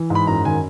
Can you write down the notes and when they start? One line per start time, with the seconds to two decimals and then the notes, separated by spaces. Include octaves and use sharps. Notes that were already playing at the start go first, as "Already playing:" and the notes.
Already playing: E3
0.10 G#2
0.15 B5
0.27 F#2 A#5
0.45 D#3 G#5